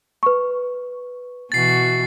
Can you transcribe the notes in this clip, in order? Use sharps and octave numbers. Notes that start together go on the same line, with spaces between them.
B4 C#6
B2 E3 F#4 A6 C7